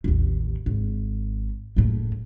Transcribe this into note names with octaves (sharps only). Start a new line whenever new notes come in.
A1 D#2
G#1
F#1 A2